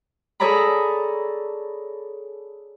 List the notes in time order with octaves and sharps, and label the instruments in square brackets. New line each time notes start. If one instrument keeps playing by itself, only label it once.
[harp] G#4 A4 C#5 D5 A#5 B5